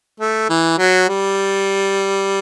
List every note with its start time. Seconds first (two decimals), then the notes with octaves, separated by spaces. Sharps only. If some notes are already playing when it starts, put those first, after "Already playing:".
0.20 A3
0.49 E3
0.78 F#3
1.08 G3